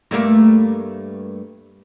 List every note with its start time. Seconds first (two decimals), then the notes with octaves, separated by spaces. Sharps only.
0.11 G2 A3 A#3